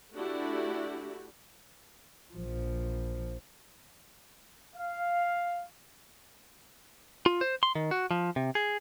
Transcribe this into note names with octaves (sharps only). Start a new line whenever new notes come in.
A3 D4 E4 F#4 G4
A#1 F3
F5
F4
C5
C6
D#3
F#4
F3
C3
G#4